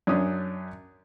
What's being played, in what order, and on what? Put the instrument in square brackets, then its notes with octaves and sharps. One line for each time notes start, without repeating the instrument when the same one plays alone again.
[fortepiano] F#2 C#4 D4 D#6